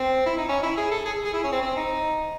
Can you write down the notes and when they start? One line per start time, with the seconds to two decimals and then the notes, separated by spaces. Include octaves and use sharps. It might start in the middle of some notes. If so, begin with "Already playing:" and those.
Already playing: C4
0.26 E4
0.38 D#4
0.49 C#4
0.63 E4
0.78 G#4
0.92 A4
1.06 G#4
1.25 G#4
1.33 E4
1.44 C#4
1.52 C4
1.63 C4
1.77 D#4